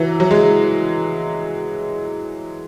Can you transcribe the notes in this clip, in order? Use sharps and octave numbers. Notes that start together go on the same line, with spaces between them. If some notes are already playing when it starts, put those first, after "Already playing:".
Already playing: E3 F#3
F#3
G#3